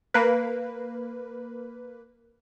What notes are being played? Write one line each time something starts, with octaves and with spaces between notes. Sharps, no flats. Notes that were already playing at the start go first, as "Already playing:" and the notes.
A#3 B4